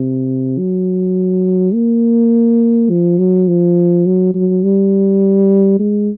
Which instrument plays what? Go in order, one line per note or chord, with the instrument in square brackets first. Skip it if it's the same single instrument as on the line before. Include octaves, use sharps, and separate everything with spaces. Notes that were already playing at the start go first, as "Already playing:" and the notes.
Already playing: [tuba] C3
F#3
A#3
F3
F#3
F3
F#3
F#3
G3
G#3